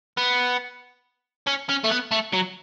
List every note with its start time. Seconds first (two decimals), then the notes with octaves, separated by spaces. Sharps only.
0.17 B3
1.47 C#4
1.69 C#4
1.84 A3
1.90 B3
2.11 A3
2.33 F#3